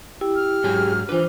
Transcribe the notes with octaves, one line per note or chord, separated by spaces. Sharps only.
E4 G4
F6
G#2 F#3 G#4 G#5
E3 D4 F4 B4 C5